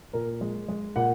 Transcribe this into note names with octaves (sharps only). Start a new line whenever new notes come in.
A#2 A#4
G#3
G#3
A#2 F#5